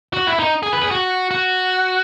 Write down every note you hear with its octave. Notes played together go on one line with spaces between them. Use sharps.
F#4
E4
D#4
G#4
B4
G#4
F#4
F#4